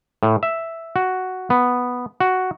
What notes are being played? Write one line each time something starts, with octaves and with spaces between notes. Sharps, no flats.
A2
E5
F#4
B3
F#4